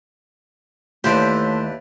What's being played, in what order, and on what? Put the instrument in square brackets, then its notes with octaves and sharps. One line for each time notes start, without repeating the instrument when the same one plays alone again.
[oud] D#2 [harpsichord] E3 D4 G4 [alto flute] A3 [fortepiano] E4 C5